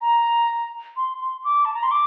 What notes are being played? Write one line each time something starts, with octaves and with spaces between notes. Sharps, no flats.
A#5
C6
C6
D6
A5
A#5
C6
D6